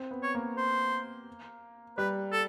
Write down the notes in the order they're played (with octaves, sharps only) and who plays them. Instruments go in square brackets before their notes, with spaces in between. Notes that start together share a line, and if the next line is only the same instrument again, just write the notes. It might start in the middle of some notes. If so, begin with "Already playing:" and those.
Already playing: [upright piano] C4
B3
[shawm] C#5
[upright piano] A#3
[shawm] C5
[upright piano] G3 [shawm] B4
[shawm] A4